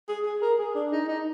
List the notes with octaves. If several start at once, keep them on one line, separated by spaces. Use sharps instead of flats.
G#4
G#4
A#4
G#4
D4
D#4
D#4